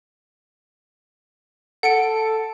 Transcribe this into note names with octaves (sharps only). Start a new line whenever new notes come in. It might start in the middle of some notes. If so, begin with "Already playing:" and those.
A4 F#5 C#7 D7